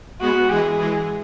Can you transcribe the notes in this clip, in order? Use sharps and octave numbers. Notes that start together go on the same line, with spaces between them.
G#3 B3 F#4
E3 G#3 G#4
E3 G#3